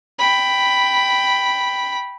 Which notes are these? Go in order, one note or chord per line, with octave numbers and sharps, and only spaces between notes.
G5 B5